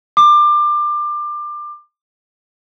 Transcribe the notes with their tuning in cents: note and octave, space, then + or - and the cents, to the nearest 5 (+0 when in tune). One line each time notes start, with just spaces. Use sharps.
D6 +25